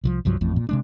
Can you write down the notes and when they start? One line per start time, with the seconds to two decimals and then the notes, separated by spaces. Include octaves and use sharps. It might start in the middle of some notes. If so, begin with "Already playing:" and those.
0.04 C2 E3 F3
0.25 C2 G2 F3 F#3
0.41 A1 F2 A2
0.56 A#2
0.69 C3 G#3 D4